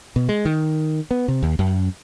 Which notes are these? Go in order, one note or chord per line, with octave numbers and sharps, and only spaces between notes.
B2
G#3
D#3
B3
C3
D#2
F#2